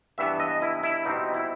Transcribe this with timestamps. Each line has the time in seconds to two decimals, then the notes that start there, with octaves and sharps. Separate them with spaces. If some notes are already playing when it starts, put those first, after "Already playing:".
0.18 G2 E3 B3 E5
0.40 D#5
0.62 E4
0.83 E4
1.05 B2 G3 C4 D#4
1.34 E4